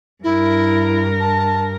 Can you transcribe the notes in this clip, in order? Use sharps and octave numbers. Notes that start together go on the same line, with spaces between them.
G2 E4 A#4
A5